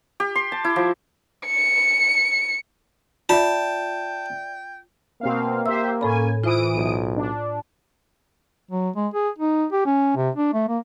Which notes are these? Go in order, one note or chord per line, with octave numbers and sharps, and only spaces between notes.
G4
C6
A5
E4
F3
C#7
F4 D5 E5 G5 A5
B2 A#3 C4 F5
G4 C5 E5 E6
A2 C#4 A4 G#5 B5
E3 F4 C5 D#6 D7
B1
D4
F#3
G#3
G#4
D#4
G4
C#4
C3
D4
A3
A#3